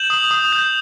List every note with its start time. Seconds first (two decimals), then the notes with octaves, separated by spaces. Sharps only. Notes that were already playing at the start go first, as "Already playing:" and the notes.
Already playing: G6 E7 F#7
0.10 D#6
0.31 D#6
0.52 G6